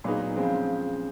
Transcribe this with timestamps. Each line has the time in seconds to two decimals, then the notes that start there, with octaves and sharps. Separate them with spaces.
0.04 A#2 F#3 B3 D#4 G#4
0.36 C#3 F3 G#3 C4